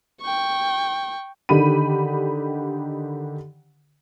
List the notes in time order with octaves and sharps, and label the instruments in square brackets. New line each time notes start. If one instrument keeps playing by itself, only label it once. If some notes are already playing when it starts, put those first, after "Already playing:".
[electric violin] G5 C#6
[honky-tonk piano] D3 D#3 G4 B5 D#7